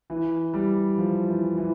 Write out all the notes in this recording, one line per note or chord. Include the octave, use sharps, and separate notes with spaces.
E3
G3
F3
E3
E3